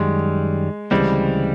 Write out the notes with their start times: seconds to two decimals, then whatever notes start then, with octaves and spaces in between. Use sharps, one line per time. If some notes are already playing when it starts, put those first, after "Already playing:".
Already playing: F#2 D#3 G3 G#3
0.91 D2 C#3 E3 G3 G#3 C4